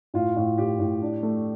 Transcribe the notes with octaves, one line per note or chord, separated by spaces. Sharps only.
A2 F4
A2 F4
A2 G4
A2
D4
A3